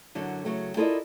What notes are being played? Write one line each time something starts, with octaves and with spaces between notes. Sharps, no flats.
F#2 D3 F#3
C#3 F#3 A3
E4 F4 A4 A#4 D5 D#5